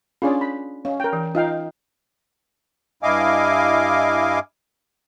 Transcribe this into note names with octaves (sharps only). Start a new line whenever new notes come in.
C#4 D4 F4 G#4 C#5 D5
B5
C#4 F5
A#4 G5
E3
D#4 F4 F5 G5
G2 E4 D#5 F5 G#5 D6